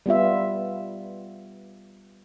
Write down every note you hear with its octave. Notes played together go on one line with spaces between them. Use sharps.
G3 B3 F4 E5